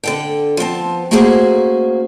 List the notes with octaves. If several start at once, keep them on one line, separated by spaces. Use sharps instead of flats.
D3 A4 G5
F3 B3 C4 A5
A3 A#3 C#4 F#4 G#4 C5